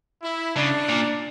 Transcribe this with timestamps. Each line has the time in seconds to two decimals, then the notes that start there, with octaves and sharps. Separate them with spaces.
0.22 E4
0.56 C#3 D4
0.89 A#2